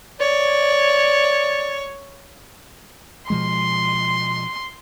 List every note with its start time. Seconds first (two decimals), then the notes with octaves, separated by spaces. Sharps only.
0.20 C#5 D5
3.30 B2 F3 G#3 C6